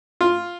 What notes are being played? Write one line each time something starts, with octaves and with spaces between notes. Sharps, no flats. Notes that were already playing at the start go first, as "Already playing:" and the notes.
F4